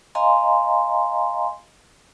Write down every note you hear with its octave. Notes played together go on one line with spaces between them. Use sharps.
D#5 F5 G#5 A#5 C6